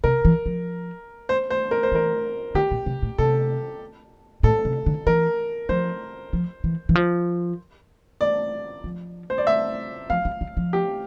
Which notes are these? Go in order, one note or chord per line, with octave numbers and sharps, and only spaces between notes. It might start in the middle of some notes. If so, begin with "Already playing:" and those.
C3 A#4
E3
F3
C5
C5
A#4
C5
E3 A#4
D3 G4
A#2
C3
A2
C3 A4
A2 A4
C3
D3
E3 A#4
F3 C5
F3
E3
E3
F3
D5
F3
C5
D5
E5
F3 F5
G3
G3
F3
G4